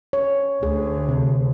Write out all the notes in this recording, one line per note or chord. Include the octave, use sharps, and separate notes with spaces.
C#5
D2 G#4
C3